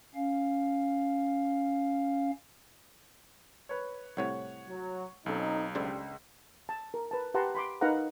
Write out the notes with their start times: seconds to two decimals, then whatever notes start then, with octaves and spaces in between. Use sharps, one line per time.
0.15 C#4 F5
3.69 B4 C#5
4.17 C2 A2 C3 C#5 F#5
4.68 F#3
5.26 B1 C4 C#4 D#4 A4
5.75 C#2 G3 D4 A4 C5
6.69 A5
6.94 A#4
7.11 B4 A5
7.34 G4 B4 F#5 A5 A#5 C6
7.55 B5 C6 D6
7.81 D#4 A#4 B4 F5 F#5 A#5